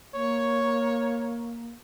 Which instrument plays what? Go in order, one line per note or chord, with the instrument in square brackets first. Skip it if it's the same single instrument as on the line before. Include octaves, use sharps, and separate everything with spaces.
[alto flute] A#3 [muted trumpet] C#5